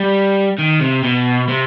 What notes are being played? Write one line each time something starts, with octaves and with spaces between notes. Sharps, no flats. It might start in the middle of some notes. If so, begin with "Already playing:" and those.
Already playing: G3
D#3
C3
B2
C3